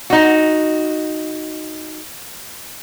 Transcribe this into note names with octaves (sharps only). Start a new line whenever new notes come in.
D#4 F#4